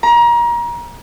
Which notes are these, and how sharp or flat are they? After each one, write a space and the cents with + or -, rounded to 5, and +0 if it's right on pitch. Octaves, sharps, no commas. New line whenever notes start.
A#5 +30